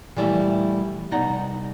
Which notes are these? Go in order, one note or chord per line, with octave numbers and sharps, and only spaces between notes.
A#2 E3 G3 A3 E4
C2 B2 D#4 D5 F#5 A#5